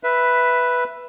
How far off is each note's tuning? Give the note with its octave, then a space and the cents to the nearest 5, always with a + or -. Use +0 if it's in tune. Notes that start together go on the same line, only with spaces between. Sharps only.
B4 +0 E5 +5